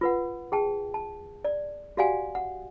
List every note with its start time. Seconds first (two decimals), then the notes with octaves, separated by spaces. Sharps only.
0.01 F4 B4 F#5
0.52 G#4 G5 A5
0.94 A5
1.45 D5
1.97 F#4 G4 D5 F5 F#5 G#5
2.35 F#5